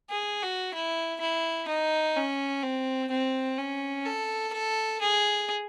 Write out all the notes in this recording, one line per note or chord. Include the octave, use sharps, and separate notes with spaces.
G#4
F#4
E4
E4
D#4
C#4
C4
C4
C#4
A4
A4
G#4